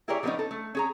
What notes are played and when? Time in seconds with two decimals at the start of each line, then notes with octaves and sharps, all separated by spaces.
0.08 E4 G4 G#4 A#4 C#5 D5
0.23 F3 G#3 A#3 B3 C#4 D#4
0.39 A4
0.51 A3
0.75 C#4 G#4 A#5